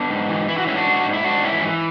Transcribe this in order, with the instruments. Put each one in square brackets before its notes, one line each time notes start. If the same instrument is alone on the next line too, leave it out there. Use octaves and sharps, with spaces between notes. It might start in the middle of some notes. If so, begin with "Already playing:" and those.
Already playing: [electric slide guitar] B3 D4
G#2
E3
E3 E4
F#4
G#2 C#4 E4
D4 F#4
G#2
G#2
E4
G#2 D4 F#4
E3 C#4 E4
E3